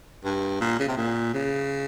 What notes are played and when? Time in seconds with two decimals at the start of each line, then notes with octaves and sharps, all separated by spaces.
0.24 G2
0.61 A#2
0.79 C#3
0.88 C3
0.97 A#2
1.34 C#3